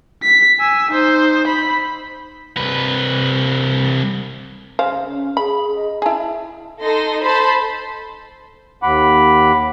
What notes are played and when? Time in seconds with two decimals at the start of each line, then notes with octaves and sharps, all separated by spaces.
0.23 B6
0.60 G#5 E6
0.92 D#4 C5
1.47 B5
2.57 C2 B4
4.79 C#3 C5 F5
5.04 C#4
5.37 G#4 B5
5.75 D#5
6.02 E4 G#4 A5
6.82 D#4 A4 C6 A#6
7.24 A4 C5 A5 B5 C6
8.83 D#2 F#5 B5 D6